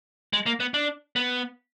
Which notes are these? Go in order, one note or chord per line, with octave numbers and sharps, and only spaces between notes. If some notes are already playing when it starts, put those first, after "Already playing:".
G#3
A#3
B3
D4
B3